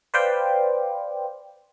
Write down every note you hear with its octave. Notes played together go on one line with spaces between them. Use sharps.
B4 C5 D5 F5 G5